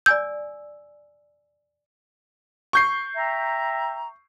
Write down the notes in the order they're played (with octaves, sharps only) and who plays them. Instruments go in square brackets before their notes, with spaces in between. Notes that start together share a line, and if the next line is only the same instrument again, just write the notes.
[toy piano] D5 G#5 E6 [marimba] G6
[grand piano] C#6 G6 C7
[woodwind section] E5 G5 A#5